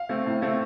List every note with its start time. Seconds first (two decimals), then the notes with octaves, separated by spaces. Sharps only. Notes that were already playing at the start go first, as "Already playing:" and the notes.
Already playing: F5
0.09 A3 C4
0.26 A2
0.42 A3 C4